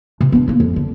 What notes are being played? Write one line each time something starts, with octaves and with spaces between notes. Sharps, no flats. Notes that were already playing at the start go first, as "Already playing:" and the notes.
C3
B3 D4
D#2 A#3
F2
D3